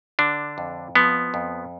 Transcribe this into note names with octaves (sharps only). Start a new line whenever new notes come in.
D3 D4
F2
F3 B3
F2